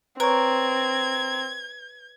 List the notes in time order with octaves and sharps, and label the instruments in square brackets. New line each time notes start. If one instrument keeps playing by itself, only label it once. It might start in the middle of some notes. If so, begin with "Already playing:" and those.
[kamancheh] C4 [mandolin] A#4 [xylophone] B4 C#5 C#6 [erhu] G#6